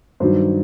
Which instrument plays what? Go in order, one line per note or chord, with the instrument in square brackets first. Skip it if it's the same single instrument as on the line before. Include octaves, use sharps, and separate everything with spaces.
[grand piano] G2 D#3 F#3 C5